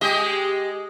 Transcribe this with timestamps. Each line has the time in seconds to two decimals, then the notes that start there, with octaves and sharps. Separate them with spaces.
0.01 G#3 G4 D#5